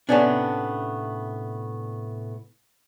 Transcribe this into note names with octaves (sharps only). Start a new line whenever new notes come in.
A2 C3 B3 C#4 D4